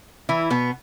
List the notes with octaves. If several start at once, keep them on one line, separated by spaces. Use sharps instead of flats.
E3 E4
B2 B3